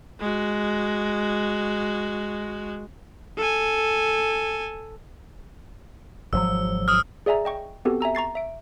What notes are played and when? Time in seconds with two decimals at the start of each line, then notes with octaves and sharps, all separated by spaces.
0.20 G#3 F#4
3.38 A4 G#5
6.33 G#1 F3 F#3 E6
6.88 D#6 F6
7.26 G#4 D5 E5 G#5 A#5
7.45 D#5 G5 C#6
7.85 B3 C4 F#4 G4 A4
8.01 E5 G#5 A#5 E6
8.15 A#5 C#6 A6 C7
8.35 E5 D7